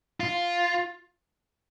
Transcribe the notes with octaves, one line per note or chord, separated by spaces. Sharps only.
F4